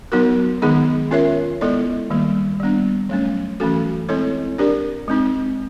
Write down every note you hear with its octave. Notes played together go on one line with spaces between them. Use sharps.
F#3 B3 D#4 F#4 A#4
D#3 G#3 B3 D#4 G#4
C#4 F4 A#4 C#5 E5
G#3 B3 E4 A4 D5
D#3 G3 A#3
G3 B3 D4
F#3 A3 C#4
E3 A3 C#4 F#4 A4
G#3 C4 E4 A4 C#5
D4 G4 A#4 D5
G#3 C4 D#4